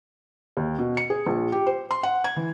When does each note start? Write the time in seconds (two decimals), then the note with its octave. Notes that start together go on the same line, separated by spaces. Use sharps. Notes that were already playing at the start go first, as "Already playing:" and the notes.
0.57 D#2
0.79 B2
0.97 C#7
1.10 G#4
1.27 A#1
1.52 G4
1.66 C5
1.91 C6
2.03 F#5
2.24 G#6
2.36 E3